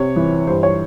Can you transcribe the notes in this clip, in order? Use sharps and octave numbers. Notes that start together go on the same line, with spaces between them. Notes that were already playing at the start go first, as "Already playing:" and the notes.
Already playing: C3 C#5
E3
G2 C5
C#5